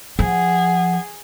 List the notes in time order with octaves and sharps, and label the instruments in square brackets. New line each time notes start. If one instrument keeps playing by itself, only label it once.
[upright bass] F3 [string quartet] G#4 [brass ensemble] F#5